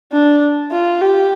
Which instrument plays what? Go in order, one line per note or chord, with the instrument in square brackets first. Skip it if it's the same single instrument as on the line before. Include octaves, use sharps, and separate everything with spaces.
[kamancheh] D4
F4
G4